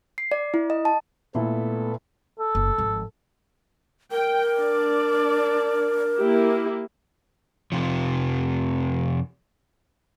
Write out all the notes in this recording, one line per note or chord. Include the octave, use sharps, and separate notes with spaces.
C7
D5
E4
D#5
A5
A#2 A3 B3 E4 A4
A4
F#1
G#1 F3
A#4 G5
D4 D5
A#3 E4 G4
F2 C3 F3